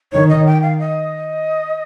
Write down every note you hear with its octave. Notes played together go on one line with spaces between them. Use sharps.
D#3 C#5
D#5
G5
F5
D#5